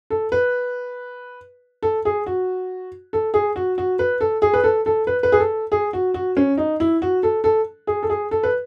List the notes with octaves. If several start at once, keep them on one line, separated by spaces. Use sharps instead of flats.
A4
B4
A4
G#4
F#4
A4
G#4
F#4
F#4
B4
A4
G#4
B4
A4
A4
B4
B4
G#4
A4
G#4
F#4
F#4
C#4
D#4
E4
F#4
A4
A4
G#4
A4
G#4
A4
B4